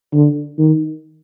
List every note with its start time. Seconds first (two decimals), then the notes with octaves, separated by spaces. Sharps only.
0.13 D3
0.58 D#3